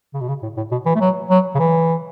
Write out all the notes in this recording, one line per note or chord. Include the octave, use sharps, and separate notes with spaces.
C#3
B2
C#3
A2
A2
B2
E3
A3
F#3
F#3
C#3
E3